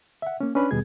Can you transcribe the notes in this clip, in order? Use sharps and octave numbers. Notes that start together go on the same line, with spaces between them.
E5 F#5
A#3 C#4
C#4 D4 B4 B5
D#2 B2 G3 B3 G#4 G#6